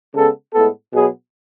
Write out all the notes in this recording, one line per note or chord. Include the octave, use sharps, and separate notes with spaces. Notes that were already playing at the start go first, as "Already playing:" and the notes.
C#3 G#3 B3 A4
A2 G#3 B3 A4
B2 F#3 B3 G#4